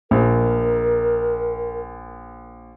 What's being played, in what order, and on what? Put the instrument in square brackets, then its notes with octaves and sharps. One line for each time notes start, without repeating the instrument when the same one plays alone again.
[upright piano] A#1 [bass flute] A#4